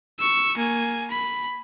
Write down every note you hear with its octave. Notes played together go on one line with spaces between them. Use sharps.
C#6 E6
A#3 G#5
B5